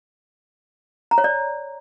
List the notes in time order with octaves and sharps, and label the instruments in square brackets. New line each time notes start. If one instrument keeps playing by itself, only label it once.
[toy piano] A#5
C#5
D5